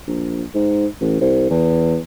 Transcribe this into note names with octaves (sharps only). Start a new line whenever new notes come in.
A#1
G#2
A1
C2
E2